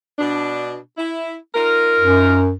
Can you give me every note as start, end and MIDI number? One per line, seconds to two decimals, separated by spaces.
0.19 0.77 47
0.19 0.77 62
0.98 1.34 64
1.55 2.41 63
1.55 2.41 65
1.55 2.41 70
2.00 2.53 42